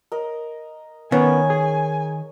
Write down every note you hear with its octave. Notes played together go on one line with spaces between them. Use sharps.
A#4 D#5
D#3 B3 C#4 C#5 G#5
G#4